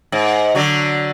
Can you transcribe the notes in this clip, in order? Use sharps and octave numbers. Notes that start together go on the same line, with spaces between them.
G#2
D3 F#3 F#4